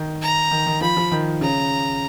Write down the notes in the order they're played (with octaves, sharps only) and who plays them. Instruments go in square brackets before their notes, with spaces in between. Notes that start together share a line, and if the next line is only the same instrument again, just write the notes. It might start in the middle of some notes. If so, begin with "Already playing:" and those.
Already playing: [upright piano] D#3
[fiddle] A#5
[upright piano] D#3
D#3
[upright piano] F3 [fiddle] B5
[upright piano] F3
D#3
[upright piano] C#3 [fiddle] A#5